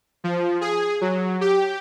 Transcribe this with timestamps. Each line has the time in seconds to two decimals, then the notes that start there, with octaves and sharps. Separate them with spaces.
0.24 F3
0.61 G#4
1.01 F#3
1.41 G4